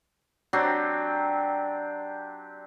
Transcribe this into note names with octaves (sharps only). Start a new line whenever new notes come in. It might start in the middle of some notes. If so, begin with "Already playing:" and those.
F#3 C4 D4 G4